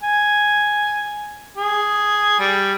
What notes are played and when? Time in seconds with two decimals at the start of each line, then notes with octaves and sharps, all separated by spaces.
0.03 G#5
1.57 G#4
2.40 G3